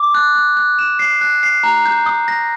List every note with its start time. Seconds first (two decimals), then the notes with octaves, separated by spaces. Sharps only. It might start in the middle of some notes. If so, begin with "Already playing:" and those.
Already playing: D6
0.14 F#6
0.35 F#6
0.57 F#6
0.79 E7
0.99 C7
1.21 F#6
1.43 C7
1.63 A#5
1.86 G6
2.06 D#6
2.28 A#6